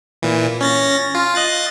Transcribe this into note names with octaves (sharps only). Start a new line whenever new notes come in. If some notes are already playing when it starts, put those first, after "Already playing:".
A#2 E3
C#4 A6 A#6
F4
D#5 F#6 A6